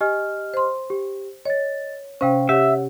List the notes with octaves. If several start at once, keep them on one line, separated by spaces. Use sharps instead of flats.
G4 D#5 G#5 F6
C5 C6
G4
C#5 D#5 A6
C3 C#4 C5 F5 G5
G4 C#5 E5 F#5